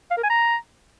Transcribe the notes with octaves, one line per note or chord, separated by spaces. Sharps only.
F5
A#4
G#5
A#5